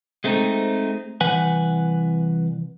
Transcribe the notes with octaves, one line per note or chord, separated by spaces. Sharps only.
G#3 A3 C4 C#4 D#4
C2 E3 B4 F#5 G#5